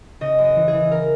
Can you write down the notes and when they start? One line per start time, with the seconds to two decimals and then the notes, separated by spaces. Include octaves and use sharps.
0.21 C#3 D#5
0.38 F#2
0.44 D#5
0.56 E3
0.68 G#4
0.73 E3
0.91 A#4